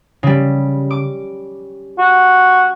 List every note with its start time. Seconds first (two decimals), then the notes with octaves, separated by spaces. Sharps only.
0.23 C#3 G3
0.91 D6
1.99 F#4